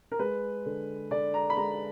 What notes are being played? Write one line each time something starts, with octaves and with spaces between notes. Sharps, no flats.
A#4
G#3 B4
D3
D3 D5
A#5
B5
G#3 A#5